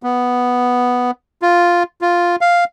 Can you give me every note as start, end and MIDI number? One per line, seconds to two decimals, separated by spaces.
0.03 1.11 59
1.42 1.83 65
2.01 2.36 65
2.41 2.64 77